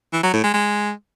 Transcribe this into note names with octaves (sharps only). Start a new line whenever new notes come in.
E3
F#3
A2
G#3
G#3